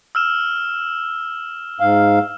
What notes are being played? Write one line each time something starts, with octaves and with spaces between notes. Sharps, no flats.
E6 F6 E7
G#2 F5